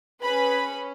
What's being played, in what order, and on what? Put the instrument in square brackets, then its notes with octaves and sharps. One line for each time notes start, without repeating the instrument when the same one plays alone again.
[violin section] C#4 G#4 B4 B5